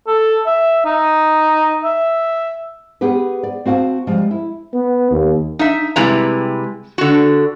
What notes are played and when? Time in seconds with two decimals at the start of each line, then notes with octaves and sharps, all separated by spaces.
0.07 A4
0.46 E5
0.86 D#4
1.84 E5
3.01 B3 G4 G#4 B4
3.43 D5
3.66 C4 F#4 F5 G5 A5
4.07 F3 G3 G#3
4.31 E4
4.74 B3
5.11 D#2
5.59 D#4 E5
5.96 C3 G3 G#3 E4 B4 A#5
6.98 D3 F#4